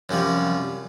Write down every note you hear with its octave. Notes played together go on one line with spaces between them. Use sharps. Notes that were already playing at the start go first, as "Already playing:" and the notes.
F#2 C3 F3 G3